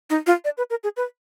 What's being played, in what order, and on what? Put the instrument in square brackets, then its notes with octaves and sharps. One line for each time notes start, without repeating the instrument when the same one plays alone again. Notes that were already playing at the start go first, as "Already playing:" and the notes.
[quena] D#4
F4
D5
B4
A#4
G#4
B4